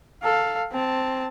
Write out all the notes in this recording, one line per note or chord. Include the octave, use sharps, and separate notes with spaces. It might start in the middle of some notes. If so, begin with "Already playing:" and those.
A4 F5
C4 A5